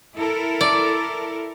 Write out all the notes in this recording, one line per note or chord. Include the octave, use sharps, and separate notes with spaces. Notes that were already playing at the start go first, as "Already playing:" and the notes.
E4 A4 A#4
D5